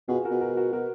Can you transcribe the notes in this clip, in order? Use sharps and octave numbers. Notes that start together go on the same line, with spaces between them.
B2 F4 G#4
F#4 A#4
B2
F#4 A#4
F#4 A#4
B2 F#4 A#4